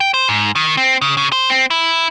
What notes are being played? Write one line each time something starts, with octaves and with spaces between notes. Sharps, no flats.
G5
C5
G#2
D#3
C4
C#3
C#3
C5
C4
E4